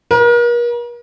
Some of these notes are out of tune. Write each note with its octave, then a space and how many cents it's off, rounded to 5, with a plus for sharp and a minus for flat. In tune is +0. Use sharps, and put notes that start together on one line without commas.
A#4 +40